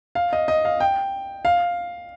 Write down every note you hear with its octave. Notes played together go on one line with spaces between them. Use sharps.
F5
D#5
D#5
F5
G5
F5